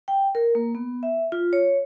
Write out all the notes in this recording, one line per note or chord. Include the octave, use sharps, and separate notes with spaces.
G5
A#4
A#3
B3
E5
F4
C#5